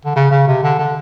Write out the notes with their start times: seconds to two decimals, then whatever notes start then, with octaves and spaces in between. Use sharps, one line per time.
0.05 D3
0.16 C#3
0.31 C#3
0.47 C3
0.63 D3
0.79 D3